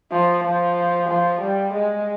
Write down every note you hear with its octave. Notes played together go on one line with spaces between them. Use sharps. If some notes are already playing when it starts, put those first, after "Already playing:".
F3
F3
F3
G3
G#3